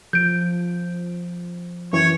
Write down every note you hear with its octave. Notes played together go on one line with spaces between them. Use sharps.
F3 G6 D7
F#2 E3 C#5 C#6